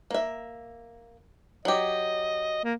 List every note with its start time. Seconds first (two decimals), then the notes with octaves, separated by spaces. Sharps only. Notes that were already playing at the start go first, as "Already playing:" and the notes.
0.11 A#3 E5
1.65 F#3 G4 D#5
2.64 A#3